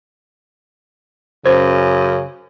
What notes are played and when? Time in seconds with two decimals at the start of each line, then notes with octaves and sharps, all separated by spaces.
1.46 F#2 C#3 C5